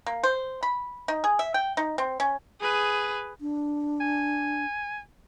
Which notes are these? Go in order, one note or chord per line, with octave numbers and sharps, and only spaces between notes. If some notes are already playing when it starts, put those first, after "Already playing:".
A#3
C5
B5
D#4
G#4
E5
G5
D#4
C4
C#4
G#4 B4
D4
G#5